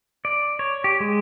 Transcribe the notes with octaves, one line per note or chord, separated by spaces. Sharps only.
D5
C#5
G4
G#3